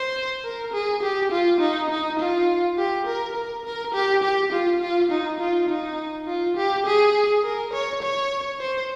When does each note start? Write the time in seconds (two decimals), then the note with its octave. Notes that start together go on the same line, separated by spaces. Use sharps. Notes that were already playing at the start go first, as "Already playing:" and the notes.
Already playing: C5
0.44 A#4
0.73 G#4
1.02 G4
1.32 F4
1.60 D#4
1.90 D#4
2.19 F4
2.78 G4
3.06 A#4
3.36 A#4
3.65 A#4
3.94 G4
4.23 G4
4.52 F4
4.81 F4
5.11 D#4
5.40 F4
5.69 D#4
6.27 F4
6.56 G4
6.86 G#4
7.44 A#4
7.73 C#5
8.02 C#5
8.60 C5